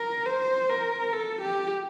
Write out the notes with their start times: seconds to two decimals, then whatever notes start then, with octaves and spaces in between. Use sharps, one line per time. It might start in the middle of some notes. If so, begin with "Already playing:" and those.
Already playing: A#4
0.26 C5
0.70 A#4
1.13 A4
1.42 G4